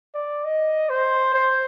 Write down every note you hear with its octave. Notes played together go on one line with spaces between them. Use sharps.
D5
D#5
C5
C5